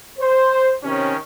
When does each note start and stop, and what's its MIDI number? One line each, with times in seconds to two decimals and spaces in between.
0.19 0.73 72
0.83 1.16 48
0.83 1.16 51
0.83 1.16 61